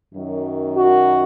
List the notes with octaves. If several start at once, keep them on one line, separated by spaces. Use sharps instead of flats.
F#2 D#3 F#3
F#4